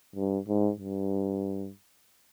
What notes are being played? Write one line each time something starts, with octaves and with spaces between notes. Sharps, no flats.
G2
G#2
G2